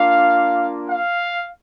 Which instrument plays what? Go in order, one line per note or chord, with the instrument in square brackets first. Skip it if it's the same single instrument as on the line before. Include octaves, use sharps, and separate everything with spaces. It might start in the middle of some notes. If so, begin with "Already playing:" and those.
Already playing: [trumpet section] A#3 D4 F4 F5
F5